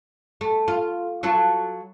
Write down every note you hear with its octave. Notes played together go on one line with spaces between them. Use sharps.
A3
F4
F#3 F4 A4